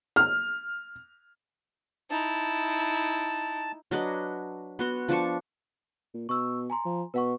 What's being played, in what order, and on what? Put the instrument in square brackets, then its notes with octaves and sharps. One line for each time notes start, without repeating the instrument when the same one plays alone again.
[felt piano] F6
[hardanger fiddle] D#4 E4 [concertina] A5
[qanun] F#3 D4 B4 D#5
B3 F#4 C6
F3 D4 A5 C#6
[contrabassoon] A#2
[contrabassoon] B2 [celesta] C#6 E6
[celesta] G#5 A#5 C6
[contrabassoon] F3
[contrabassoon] B2 [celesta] B4 F#5 C#6